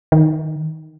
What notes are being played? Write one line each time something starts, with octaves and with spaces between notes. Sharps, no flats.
D#3